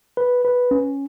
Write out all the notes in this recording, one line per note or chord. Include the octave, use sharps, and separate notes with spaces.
B4
B4
C#4